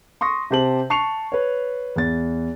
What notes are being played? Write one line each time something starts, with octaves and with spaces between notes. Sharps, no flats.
C6 C#6 D#6 A#6
C3 G4 C5 A5 F#7
A5 C#6 C7 C#7 F7
B4 C#5
E2 A6